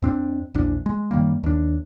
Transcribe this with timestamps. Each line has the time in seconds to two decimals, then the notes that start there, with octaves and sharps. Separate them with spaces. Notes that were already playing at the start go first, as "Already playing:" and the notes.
0.02 F2 C4 D4
0.54 A#1 E2 D4
0.86 G#3
1.11 F#2 D#3 G3 A#3
1.43 D#2 D4